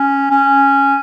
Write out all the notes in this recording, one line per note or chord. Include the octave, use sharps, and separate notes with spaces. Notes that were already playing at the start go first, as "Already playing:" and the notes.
Already playing: C#4
C#4